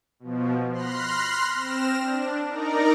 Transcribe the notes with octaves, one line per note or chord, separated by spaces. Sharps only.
B2 F3
B5 C6 F6 F#6 A#6 C7
C4 F6 A#6 E7
D4
D#4 A#4 D5 A#5